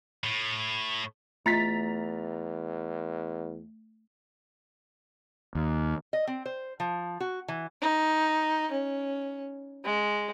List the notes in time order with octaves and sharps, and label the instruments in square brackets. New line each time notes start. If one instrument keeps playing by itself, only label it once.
[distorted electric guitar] A2
[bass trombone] E2 [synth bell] A3 [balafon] F4 D#5 [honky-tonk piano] A#5 A6 B6
[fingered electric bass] D#2
[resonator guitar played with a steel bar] D#5
C4
C5
F3
F#4
E3
[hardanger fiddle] D#4
C#4
G#3